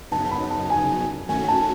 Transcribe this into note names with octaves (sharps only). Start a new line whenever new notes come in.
F#2 C#3 F#3 B3 D#4 A5
B5
A5
G#5
D#3 A3 C#4 F#4 G#5
A5